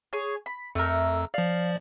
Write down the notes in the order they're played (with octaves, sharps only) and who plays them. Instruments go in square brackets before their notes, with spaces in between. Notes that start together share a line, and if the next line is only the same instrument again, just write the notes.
[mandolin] G#4 C#5
B5
[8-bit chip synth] F2 E6 [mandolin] A3 A#4
[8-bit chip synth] F3 D5 [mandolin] F5